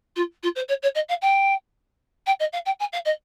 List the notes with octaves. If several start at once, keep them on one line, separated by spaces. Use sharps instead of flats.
F4
F4
C5
C#5
C#5
D#5
F5
G5
G5
D#5
F5
G5
G#5
F5
D#5